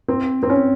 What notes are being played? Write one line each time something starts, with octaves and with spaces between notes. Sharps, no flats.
C4
C4
C#4